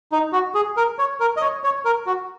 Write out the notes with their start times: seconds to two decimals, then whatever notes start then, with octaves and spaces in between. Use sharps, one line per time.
0.12 D#4
0.33 F#4
0.55 G#4
0.77 A#4
0.99 C#5
1.20 A#4
1.37 D#5
1.41 C#5
1.64 C#5
1.85 A#4
2.06 F#4